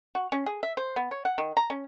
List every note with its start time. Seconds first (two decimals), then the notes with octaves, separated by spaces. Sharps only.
0.15 F#4
0.32 C#4
0.46 G#4
0.63 E5
0.77 C5
0.96 B3
1.11 C#5
1.25 F#5
1.38 D#3
1.57 A#5
1.70 C#4